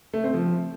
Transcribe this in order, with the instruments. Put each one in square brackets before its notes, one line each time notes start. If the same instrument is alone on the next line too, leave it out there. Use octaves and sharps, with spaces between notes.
[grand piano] A3
C4
F3